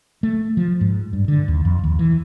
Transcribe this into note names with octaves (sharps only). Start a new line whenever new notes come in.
A3
F3
G#2
G2
D3
D#2
F2
D#2
E3